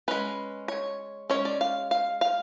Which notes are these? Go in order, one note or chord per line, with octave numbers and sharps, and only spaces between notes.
G#3 C#4 B4
C#5
G#3 C#4 C#5
D5
F5
F5
F5